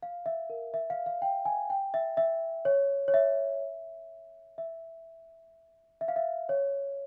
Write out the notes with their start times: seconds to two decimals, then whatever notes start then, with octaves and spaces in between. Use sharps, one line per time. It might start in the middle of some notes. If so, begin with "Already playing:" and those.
0.03 F5
0.26 E5
0.50 A#4
0.74 E5
0.90 F5
1.06 F5
1.22 G5
1.45 G#5
1.70 G5
1.94 E5
2.17 E5
2.65 C#5
3.08 C#5
3.14 E5
4.58 E5
6.01 E5
6.08 F5
6.16 E5
6.49 C#5